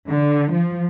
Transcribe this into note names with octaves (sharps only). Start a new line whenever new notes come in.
D3
F3